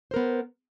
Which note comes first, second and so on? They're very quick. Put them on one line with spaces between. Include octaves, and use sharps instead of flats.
C5 A#4 B3